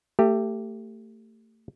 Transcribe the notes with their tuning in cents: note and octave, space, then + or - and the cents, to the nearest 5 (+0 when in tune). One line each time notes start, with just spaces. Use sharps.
A3 +25 G4 +0